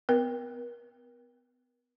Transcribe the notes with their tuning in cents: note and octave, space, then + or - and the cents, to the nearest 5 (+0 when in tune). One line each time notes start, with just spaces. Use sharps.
B3 +35 A#4 +40